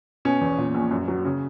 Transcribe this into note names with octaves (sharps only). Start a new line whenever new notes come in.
B2 C#4
E2
A#2
A#1
F#2
F#3
C#3